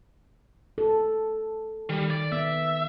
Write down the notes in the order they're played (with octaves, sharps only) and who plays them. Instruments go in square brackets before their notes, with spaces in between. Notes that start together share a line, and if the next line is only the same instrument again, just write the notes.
[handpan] A4
[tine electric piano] D#3 [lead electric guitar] G3
[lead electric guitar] D5
[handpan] B3 [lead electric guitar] E5